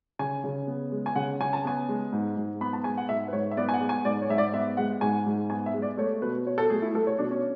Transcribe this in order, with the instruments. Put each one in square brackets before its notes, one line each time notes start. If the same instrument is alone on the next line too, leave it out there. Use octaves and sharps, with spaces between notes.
[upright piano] C#3 G#5
C#3
B3
G#3
G#5
C#3 F#5
C#3 G#5
A5
B3 G#5
G#3
G#2
G#2
B3 B5
A5
G#3 G#5
F#5
G#2 E5
B4
G#2 C#5
E5
B3 D5
G#5
F#5
G#3
G#5
G#2 D5
C#5
G#2 E5
D5
B3 E5
G#3 F#5
G#2 G#5
G#2
B3 G#5
E5
G#3
D5
A3 C#5
B2 B4
B2 C#5
A4
A3 G#4
E4
A3 A4
C#5
B2 D4
C#4